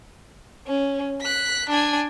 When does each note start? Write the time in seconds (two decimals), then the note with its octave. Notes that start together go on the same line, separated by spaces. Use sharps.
0.67 C#4
1.21 F#6 B6
1.70 D4 G#5